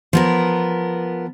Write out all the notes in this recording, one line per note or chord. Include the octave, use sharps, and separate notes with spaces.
F3 B3 A#4